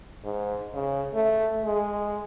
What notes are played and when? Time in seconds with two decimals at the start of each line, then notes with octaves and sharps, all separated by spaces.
0.24 G#2
0.74 C#3
1.14 A3
1.64 G#3